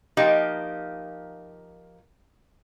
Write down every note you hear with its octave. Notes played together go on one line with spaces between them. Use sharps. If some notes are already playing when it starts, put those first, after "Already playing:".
F3 A#3 D#4 G4